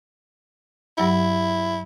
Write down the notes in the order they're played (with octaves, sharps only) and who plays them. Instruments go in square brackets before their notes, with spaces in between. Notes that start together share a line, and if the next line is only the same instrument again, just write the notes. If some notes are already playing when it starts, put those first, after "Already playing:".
[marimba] G2 F#3 E6 [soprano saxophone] E4